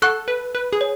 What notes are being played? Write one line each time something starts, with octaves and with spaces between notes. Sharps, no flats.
A4 F#5 C#6 F#6
B4
B4
G#4
C#5